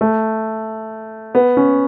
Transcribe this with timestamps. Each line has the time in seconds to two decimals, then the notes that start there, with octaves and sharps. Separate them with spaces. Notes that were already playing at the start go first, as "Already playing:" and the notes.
0.01 A3
1.35 B3
1.57 C#4